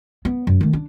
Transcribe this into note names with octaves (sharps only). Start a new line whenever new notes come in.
B3
F#2
D#3 A3
D4